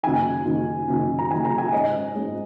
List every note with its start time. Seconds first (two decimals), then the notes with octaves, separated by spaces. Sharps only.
0.03 F#1 F#2 D#3 G#5
0.46 F#1 F#2 D#3
0.88 F#1 F#2 D#3
1.19 A#5
1.30 F#1 F#2 D#3 G#5
1.45 A#5
1.58 G#5
1.72 G#2 G#3 C#4 D#5
2.15 G#2 G#3 C#4